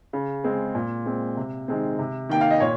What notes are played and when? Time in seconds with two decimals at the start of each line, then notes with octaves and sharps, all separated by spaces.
0.13 C#3
0.44 G#3 C4
0.75 A#2
1.06 G#3 C4
1.37 C3
1.68 D#3 G#3 C4
1.99 C3
2.29 D#3 A#3 G5
2.41 F5
2.50 D#5
2.60 A#2 C#5